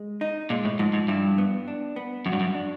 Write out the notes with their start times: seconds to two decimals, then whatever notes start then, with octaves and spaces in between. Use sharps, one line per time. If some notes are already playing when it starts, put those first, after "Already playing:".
Already playing: G#3
0.21 D#4
0.50 A#2 G#3
0.65 A2
0.79 G#2 F3
0.93 G#2
1.08 G2 E4
1.38 B3
1.68 D4
1.96 B3
2.26 F#2 F#4
2.33 G2
2.40 F#2
2.55 D4